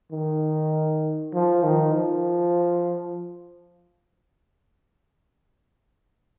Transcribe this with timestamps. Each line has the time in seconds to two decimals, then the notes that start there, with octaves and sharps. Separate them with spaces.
0.12 D#3
1.34 F3
1.63 D#3
1.94 F3